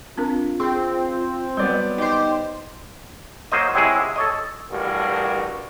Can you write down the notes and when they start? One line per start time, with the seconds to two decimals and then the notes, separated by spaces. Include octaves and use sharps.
0.18 C4 D4 F4 A#4
0.60 C4 G#4
1.57 F#3 G3 B3 D5 G6
1.98 D#4 G4 C5 C6 D6
3.52 F#3 A#3 C5 D#5
3.74 C3 F#3 G#3 E4 G#4
4.16 A4 C#5 D#5
4.71 A1 G2 F#4 A#4